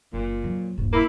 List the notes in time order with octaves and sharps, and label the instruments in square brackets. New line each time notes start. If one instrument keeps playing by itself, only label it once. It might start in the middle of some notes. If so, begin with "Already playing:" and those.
[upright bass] F#1 [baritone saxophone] A#2
[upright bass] F2 F#3
D#1 G2
[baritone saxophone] A#3 [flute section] E4 B5